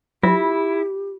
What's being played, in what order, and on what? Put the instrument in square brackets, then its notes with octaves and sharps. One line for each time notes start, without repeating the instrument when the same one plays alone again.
[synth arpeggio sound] F#3 [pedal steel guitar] E4 [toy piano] F4 [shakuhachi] G4